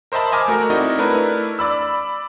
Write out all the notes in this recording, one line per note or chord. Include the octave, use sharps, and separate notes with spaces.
A#4 C5 D#5 E5 A5 B5
D#5 G#5 D6 F6
A3 F#4 A#4
C4 D#4 E4 F#4 D5 D#5
A3 D4 E4 A#4 B4
D5 B5 E6